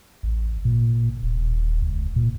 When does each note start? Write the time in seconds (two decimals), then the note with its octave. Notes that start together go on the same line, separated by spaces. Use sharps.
0.23 A1
0.65 A#2
1.22 D#1
1.82 C#2
2.16 A#2